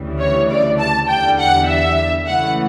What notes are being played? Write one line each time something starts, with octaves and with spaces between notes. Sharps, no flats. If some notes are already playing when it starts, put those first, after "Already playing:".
Already playing: D2 C#3 E3 G3
C#5
D5
A5
E2 D3 G3 G5
F#5
E5
C#2 C#3 E3 A3 F#5